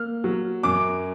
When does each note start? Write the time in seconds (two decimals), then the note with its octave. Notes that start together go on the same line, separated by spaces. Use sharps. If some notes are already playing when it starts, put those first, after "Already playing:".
Already playing: A#3 F6
0.24 F#3
0.63 F#2 D6